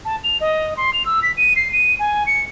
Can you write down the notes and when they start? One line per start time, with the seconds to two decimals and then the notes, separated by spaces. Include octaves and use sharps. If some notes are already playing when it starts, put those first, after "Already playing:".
0.05 A5
0.24 F7
0.41 D#5
0.77 C6
0.93 F7
1.06 E6
1.23 B6
1.37 D#7
1.56 C7
1.73 D#7
1.99 G#5
2.27 C#7